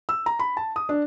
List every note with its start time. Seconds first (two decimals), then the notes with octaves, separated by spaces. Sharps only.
0.09 E6
0.26 A#5
0.39 B5
0.57 A5
0.76 D#6
0.89 D4